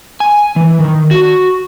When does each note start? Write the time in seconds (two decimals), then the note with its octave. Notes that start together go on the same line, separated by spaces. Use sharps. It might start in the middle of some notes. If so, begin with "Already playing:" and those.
0.20 G#5
0.56 E3
0.80 D#3
1.11 F#4